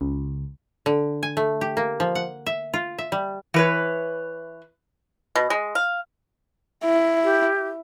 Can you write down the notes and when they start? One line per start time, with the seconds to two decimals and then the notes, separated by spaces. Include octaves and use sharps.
0.01 C#2
0.86 D3
1.23 G#5
1.37 A3
1.61 G4
1.77 A#3
2.00 F3
2.15 F#5
2.46 E5
2.74 F4
2.99 E5
3.12 G3
3.54 E3 B4 C#5
5.35 B2
5.50 G#3
5.75 F5
6.84 E4
7.24 G4